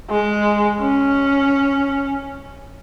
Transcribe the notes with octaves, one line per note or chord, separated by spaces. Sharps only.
G#3
C#4